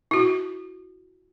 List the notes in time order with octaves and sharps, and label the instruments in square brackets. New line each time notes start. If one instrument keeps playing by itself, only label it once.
[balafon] E4 F#4